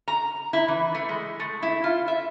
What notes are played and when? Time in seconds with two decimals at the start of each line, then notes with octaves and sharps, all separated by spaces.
0.08 A#5
0.53 E4
0.68 E3
0.95 A3
1.09 G#3
1.40 A3
1.63 E4
1.84 F4
2.08 E5